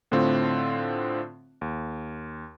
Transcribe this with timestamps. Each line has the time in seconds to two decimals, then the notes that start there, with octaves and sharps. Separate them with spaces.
0.11 A2 D3 A3 C4 F4
1.61 D#2